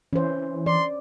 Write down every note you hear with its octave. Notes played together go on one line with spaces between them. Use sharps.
E3 C#4 C5
D5 C6